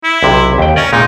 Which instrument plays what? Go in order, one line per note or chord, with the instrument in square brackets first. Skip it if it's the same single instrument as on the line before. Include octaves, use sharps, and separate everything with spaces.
[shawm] E4
[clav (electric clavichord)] B1 C3
D#2 G5
[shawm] C#4 [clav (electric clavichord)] D5 D#5 A#5
[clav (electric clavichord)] A#2 G#3 A#4 [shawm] D#4